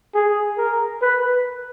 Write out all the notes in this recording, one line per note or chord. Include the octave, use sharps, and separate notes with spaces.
G#4
A#4
B4